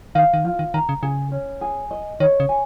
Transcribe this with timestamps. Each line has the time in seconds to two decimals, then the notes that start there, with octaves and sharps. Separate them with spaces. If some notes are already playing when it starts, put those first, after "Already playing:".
0.15 D#3 F5
0.34 D#3
0.45 F3 F4
0.59 D#3
0.74 D#3 A#5
0.89 C#3
1.02 C#3 G#4
1.32 C#4
1.61 G#4
1.91 D#5
2.20 D#3 C#5
2.40 C#3
2.49 G#5